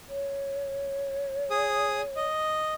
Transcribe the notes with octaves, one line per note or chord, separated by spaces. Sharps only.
C#5
G#4 D#6
D#5